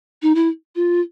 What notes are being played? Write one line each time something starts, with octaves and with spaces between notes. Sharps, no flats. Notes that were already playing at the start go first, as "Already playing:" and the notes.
D#4
E4
F4